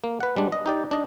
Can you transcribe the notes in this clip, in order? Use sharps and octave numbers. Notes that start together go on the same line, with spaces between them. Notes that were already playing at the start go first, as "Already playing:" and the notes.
A#3
B4 F#5
G3 G#3 D4
D#5
D#4 G4 D5
D4 D#5